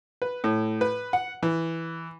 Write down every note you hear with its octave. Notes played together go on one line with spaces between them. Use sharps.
B4
A2
B4
F#5
E3